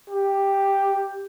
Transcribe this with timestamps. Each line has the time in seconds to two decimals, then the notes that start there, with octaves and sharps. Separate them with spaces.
0.10 G4